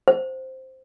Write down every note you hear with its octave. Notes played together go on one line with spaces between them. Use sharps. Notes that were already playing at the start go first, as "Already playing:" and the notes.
C5